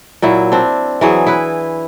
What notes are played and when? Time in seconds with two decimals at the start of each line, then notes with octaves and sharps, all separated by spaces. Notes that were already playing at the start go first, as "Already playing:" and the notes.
0.22 A#2 F#3 E4
0.52 C4 D4
1.01 E3 F#3 G#4
1.27 E4 B4